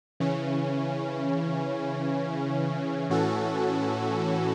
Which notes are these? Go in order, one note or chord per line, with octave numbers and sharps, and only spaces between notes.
C#3 E3 C#4
A2 E3 C#4 F#4 A4